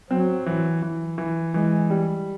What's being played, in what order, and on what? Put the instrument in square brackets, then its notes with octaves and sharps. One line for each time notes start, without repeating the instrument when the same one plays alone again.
[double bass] F#3 [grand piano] C4
[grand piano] E3
E3
E3
[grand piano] E3 [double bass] G#3
[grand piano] G3